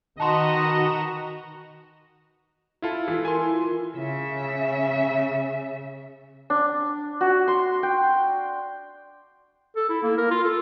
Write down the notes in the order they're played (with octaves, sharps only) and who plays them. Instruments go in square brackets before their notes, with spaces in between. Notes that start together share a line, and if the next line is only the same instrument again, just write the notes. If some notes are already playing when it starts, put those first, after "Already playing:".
[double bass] D#3 [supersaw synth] F#4 A#5 E7 [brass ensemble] B4 D#5 [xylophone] A5 C6
[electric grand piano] E4 F4 A4
[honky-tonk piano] E3
[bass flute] A#4 [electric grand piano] G#5 C6
[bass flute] F4
[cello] C#3 E5
[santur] D4
F#4
C6
G5
[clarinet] A4
E4
A#3
A#4
F4
A4